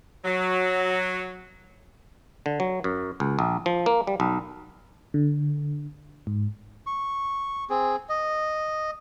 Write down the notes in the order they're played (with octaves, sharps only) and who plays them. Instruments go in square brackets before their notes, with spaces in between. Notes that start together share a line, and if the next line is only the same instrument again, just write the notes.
[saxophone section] F#3
[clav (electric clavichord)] D3
F#3
F#2
C#2
A#1
F3
A#3
G3
B1
[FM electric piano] D3
G#2
[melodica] C#6
C4 G#4
D#5